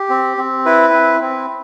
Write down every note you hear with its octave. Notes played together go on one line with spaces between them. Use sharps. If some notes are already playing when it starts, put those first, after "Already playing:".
Already playing: G4
C4
C4
E4 B4
C4
C4